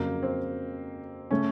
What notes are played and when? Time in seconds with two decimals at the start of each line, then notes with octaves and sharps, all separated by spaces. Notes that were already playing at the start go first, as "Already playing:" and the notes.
Already playing: F2 C#3 F#3 A#3
0.23 C4
1.31 C#3 A3 C#4